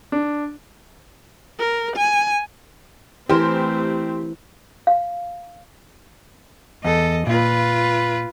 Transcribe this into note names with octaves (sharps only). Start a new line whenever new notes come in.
D4
A#4
G#5
E3 A3 C4 G4 A#4 C5
F5
E2 A4 D#5
A#2 F4 B4